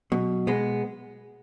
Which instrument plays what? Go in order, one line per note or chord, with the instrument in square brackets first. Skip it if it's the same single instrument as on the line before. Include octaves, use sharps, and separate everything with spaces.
[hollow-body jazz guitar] B2 [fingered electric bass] F#3
[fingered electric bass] B2 [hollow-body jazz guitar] G#3 B3